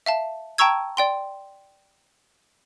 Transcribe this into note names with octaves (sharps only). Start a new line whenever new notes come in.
E5 F5 A5
G5 A5 A#5 C#6 E6 G#6
D5 G5 C6